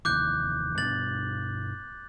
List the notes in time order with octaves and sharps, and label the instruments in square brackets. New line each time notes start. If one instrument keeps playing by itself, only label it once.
[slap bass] F1 D#2 E3 [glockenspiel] D6 F#6 G6
[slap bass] G2 B2 D4 [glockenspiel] A6 F#7